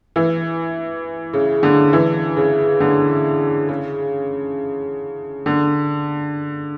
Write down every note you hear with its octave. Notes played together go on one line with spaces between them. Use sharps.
E3
C#3
D3
E3
C#3
D3
C#3
D3